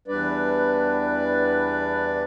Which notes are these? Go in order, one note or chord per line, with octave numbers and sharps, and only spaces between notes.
E2 G3 D4 B4 D5